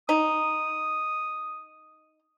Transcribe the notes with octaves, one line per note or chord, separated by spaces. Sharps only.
D#4 D#6